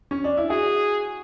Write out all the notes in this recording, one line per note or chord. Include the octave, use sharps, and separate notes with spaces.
C#4
D4
E4
F#4 G#4